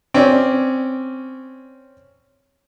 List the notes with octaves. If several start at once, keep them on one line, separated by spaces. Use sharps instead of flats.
C4 C#4 D5